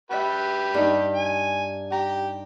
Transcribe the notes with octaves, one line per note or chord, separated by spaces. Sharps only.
G4 B4 E5 F#6
G2 D#4
G#5
G4 A#5